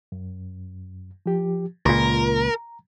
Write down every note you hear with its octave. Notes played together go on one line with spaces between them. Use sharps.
F#2
F3 G4
C#2 A#2 A#4 A#5